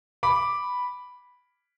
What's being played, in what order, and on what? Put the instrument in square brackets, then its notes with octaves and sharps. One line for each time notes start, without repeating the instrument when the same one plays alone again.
[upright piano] B5 D6